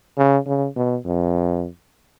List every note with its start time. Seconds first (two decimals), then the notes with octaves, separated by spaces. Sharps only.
0.18 C#3
0.47 C#3
0.76 B2
1.05 F2